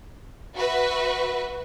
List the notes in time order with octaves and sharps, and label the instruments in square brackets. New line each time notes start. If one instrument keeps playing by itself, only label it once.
[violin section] F#4 B4 E5